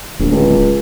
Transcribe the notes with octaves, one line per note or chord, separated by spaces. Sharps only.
D1 A#1
C#2